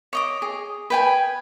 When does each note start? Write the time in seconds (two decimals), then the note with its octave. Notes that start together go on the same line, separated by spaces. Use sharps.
0.13 C#5 D#5 D6
0.42 G#4
0.90 B4 G5 G#5